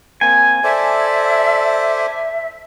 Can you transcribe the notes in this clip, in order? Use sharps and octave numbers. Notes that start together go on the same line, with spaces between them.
A#3 C4 G#5
A4 C5 D5 E5